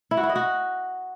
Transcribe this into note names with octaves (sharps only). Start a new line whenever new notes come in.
E4
F#4
E4
D#5
F#4